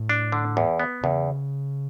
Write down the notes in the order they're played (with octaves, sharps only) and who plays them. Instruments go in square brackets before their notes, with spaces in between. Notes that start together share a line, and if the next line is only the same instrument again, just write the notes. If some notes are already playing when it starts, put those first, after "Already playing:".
Already playing: [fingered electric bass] A2
[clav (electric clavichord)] D4
D3
E2
B3
[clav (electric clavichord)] E2 [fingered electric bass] C#3